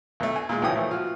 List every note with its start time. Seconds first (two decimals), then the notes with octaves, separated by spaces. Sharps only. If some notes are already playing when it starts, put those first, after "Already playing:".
0.20 B1 A3
0.36 G#5
0.49 A#2 G#3
0.62 C2 A2 E3 F#3 G5 D#6
0.76 E3 F3 A3
0.91 F4 F#4